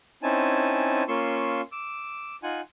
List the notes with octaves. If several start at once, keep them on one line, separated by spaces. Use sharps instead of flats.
C4 C#4 D#4 E4 G#5 A5
A#3 C#4 F4 C6 C#6 E6
D6 E6
D#4 F4 F#5 G#5